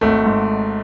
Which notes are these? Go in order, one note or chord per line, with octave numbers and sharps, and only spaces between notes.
G#1 A3
G#2